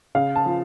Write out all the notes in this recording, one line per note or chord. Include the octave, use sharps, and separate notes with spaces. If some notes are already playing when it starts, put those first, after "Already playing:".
C#3 F5
A5
F3